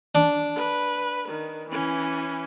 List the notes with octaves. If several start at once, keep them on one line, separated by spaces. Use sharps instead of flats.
D4
B4
D#3
E3 C#4